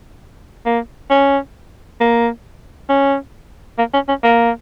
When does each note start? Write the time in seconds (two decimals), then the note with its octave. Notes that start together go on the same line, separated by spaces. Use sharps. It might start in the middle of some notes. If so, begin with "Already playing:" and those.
0.66 A#3
1.10 C#4
2.01 A#3
2.89 C#4
3.78 A#3
3.94 C#4
4.08 C#4
4.23 A#3